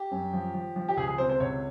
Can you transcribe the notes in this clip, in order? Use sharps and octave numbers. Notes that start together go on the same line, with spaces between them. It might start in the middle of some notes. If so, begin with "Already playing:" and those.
Already playing: G4
F#2
F3
F3
F3
G4
C#2 G#4
G#4
C3 C5
C5
C#2 C#5